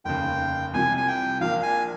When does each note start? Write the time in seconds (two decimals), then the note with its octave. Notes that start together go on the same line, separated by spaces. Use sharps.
0.05 F1 D#2 C#3 G5
0.74 C2 C3 F3 G#5
0.97 G#5
1.08 G5
1.41 A#1 A#2 F3 F5
1.63 G#5